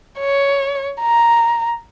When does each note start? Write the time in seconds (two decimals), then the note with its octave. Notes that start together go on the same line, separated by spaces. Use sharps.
0.20 C#5
1.01 A#5